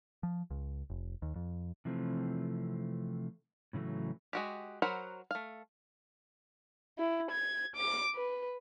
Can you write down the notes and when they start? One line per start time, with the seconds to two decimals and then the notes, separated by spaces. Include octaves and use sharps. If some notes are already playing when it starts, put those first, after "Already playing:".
0.23 F3
0.50 C#2
0.90 F1
1.22 D#2
1.36 F2
1.85 C3 E3 F3 A3 C4
3.73 A2 C#3 E3 F#3 A3
4.33 G#3 F#4 G4
4.82 F#3 A#4 C5 F#5 B5
5.31 A3 F5
6.98 E4
7.31 G#6
7.76 D6
8.15 B4